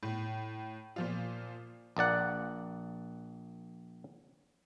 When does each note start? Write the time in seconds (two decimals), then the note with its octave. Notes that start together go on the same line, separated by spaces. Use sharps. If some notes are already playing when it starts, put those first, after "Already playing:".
0.03 A2
0.96 A#2 F3 F4
1.97 A#1 A#3 D5 F#5